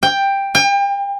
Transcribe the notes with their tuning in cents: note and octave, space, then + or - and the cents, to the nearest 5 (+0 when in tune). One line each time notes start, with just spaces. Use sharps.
G5 +10
G5 +35